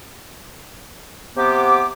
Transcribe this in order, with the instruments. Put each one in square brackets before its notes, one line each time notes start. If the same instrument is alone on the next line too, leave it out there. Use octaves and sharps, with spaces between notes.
[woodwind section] C3 B3 G4 [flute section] D6